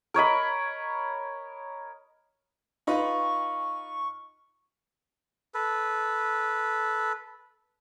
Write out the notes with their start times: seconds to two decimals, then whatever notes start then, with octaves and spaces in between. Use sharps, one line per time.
0.14 A#4 C#5 D#5 B5
2.87 D#4 F4 B4 C#6
5.54 A4 B4